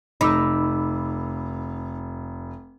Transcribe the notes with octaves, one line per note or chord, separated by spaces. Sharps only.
F1 D#4 B5 D6 E6